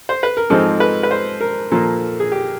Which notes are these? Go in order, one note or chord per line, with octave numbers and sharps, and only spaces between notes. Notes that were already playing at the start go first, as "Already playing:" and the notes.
C5
B4
A#4
G#2 F3 G#3 C4 D#4 A4
B4
B4
C5
A#4
A#2 F3 A#3 A4
G#4
G4